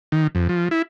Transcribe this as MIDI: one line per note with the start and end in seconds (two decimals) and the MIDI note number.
0.12 0.27 51
0.35 0.48 41
0.49 0.68 53
0.71 0.82 64